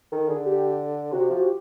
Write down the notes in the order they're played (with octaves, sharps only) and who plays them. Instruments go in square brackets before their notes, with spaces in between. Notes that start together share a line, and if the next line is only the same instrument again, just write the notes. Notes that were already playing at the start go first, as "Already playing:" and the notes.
[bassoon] D#3 [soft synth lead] A4
[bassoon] D3 [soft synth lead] G#4
[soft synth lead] G4
[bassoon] C3 [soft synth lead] F#4
[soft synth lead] G4
[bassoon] F3 [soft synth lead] F#4
[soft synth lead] G4